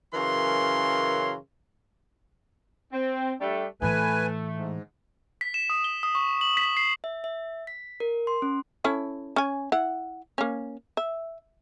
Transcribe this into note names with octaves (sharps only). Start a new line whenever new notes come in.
F#2 C#3 E3 A#4 C#5 C6
C4
G3 A3 D4
A2 E3 A3 B4 G#5
G#2
B6
E7
D#6
G7
D#6
C#6
F#7
B6
C7
E5
E5
B6
A#4
C6
C#4
C#4 E4 A4
C#4 G#5
E4 F#5
A#3 C#4
E5